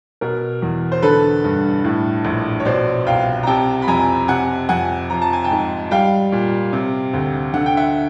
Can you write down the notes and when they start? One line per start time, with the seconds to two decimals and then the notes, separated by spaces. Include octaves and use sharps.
0.21 B2 A#4
0.62 E2
0.92 C5
1.02 D3 A4 B4
1.44 G2
1.84 A2
2.25 A#1
2.60 C#5
2.65 B2 C5 D5
3.07 C2 F5 G5
3.43 A#5
3.47 C3 G5 A5
3.82 B5
3.87 F2 G#5 A#5
4.28 C3 F#5 G#5
4.69 F2 F#5 G#5
5.10 F3 A#5
5.22 A5
5.33 G#5
5.44 G5 A5
5.51 G#2
5.91 G3 F5 G5
6.32 A#2
6.73 C3
7.13 D2
7.54 D3 F#5
7.66 G5
7.77 E5 F#5